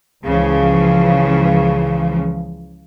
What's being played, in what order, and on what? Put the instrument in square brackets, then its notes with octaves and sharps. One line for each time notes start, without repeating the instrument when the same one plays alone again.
[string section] C#2 C#3 E3 F3